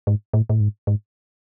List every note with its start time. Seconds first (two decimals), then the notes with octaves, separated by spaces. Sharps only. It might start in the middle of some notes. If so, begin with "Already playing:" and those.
0.07 G#2
0.33 A2
0.50 A2
0.60 G#2
0.87 G#2